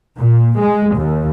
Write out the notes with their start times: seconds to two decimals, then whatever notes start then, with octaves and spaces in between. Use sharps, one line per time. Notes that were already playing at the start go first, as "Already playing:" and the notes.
0.19 A#2
0.60 G#3
0.98 D#2